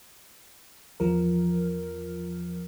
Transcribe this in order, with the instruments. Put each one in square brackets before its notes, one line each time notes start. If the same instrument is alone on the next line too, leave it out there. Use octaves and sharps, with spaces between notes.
[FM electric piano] E2 F3 A#4